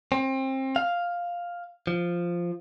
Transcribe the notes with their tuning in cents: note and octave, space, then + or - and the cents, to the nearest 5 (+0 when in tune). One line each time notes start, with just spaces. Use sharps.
C4 +30
F5 +5
F3 -5